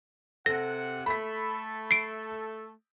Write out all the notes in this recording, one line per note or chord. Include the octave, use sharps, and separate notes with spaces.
C3 A4 F#5 A#6
A3 A4 B5 B6
C7 D7